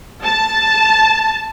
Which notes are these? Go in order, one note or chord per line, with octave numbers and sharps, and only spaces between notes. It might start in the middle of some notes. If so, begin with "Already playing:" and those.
A5